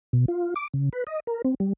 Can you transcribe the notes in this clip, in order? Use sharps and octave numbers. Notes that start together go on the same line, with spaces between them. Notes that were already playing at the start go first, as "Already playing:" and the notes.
B2
F4
D6
C#3
B4
D#5
A#4
C4
G3